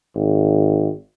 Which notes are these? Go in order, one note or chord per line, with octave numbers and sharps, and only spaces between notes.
G#1